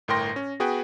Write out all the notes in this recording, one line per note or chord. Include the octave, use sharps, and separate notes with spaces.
G1 A2 A#4 G5 C6 A#6
C#4
B3 F#4 G#4 B4 G5